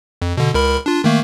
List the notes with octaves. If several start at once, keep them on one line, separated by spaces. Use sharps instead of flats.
F2
B2 D3
C#2 A#4 B5
D4 F4
D#3 A3 A#3